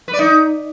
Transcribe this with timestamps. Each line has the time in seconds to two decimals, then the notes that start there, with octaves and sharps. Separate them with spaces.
0.08 B4
0.13 D5
0.19 D#4